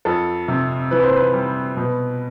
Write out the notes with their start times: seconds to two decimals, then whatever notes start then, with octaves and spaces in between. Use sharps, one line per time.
0.05 F2 A4
0.48 C3
0.91 E3 B4
1.04 C5
1.16 B4
1.34 G3
1.77 B2